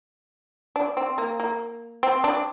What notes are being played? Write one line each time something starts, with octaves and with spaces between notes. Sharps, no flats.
D4
C4
A#3
A#3
C4
D4